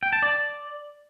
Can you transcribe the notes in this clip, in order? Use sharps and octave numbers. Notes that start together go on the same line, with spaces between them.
G5
A5
D5